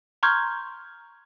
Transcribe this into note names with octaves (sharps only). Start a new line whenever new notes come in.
A#5 C6 C#6 F6 G6 G#6